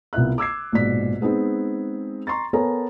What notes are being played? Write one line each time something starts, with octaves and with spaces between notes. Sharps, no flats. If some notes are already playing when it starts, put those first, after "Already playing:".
C2 B3 F4 E5 F#6
D6 E6 G#6 C7
A#1 G#2 B2 D5 B6
G#3 B3 C4 D#4 G#4
A#5 C6 C#6 A6
B3 A4 A#4 C#5 G#5 A#5